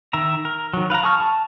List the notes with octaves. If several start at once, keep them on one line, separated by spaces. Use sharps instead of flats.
D#3 E5 A#5
A#4
D#3 F#3
B4 F5 F#5 A#5
G#4 A5 C#6 F6
A5